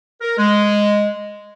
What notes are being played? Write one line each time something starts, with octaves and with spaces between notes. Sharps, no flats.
A#4
G#3